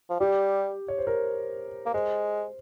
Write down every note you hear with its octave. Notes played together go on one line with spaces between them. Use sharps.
F3
G3 G4
C#5
C5
A#4
A#3
G#3 C5